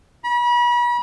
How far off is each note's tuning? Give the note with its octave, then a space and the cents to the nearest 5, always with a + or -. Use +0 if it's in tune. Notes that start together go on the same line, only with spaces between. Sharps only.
B5 -40